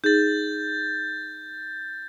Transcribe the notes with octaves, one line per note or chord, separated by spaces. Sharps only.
D#4 G#4 G6 A6